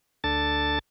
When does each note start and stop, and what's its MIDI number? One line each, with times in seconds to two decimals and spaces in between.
0.24 0.79 38
0.24 0.79 62
0.24 0.79 69
0.24 0.79 81
0.24 0.79 93